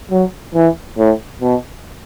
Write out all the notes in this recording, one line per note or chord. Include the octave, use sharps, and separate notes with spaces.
F#3
E3
A2
B2